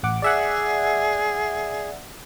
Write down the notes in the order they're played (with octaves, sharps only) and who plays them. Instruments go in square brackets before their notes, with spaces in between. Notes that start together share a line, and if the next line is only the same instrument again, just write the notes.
[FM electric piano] A1 F#5 D6
[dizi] G#4 [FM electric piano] D5 E5 F#5